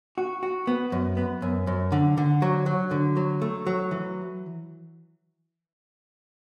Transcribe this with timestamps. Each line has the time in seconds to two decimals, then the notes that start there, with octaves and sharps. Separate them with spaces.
0.18 F#4
0.43 F#4
0.67 B3
0.92 F#2
1.17 B3
1.42 F#2
1.67 F#2
1.92 D3
2.17 D3
2.42 F#3
2.66 F#3
2.91 D3
3.17 F#3
3.42 A3
3.67 F#3
3.91 E3